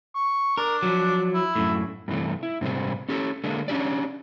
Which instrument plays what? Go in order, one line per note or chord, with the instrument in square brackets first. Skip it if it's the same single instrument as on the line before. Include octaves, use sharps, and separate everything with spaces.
[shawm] C#6
[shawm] D4 [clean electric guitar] A#4
[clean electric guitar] F3 F#3
[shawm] E4
[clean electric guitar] F#2 A2
[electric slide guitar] G2 C3 E3 A3
E4
G#2 C3 G3 C5
C#4 G4 A4
D3 G#3 A#3 D4
C#4 D4 G4 D5